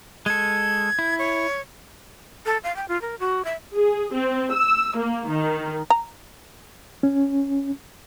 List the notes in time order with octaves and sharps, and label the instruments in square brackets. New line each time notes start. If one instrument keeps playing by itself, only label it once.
[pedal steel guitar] G#3 A4 [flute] G#6
[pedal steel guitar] E4
[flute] C#5
[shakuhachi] A4
F5
G5
F4
A#4
F#4
E5
[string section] G#4
C4
E6
A#3
D#3
[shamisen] A#5
[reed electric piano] C#4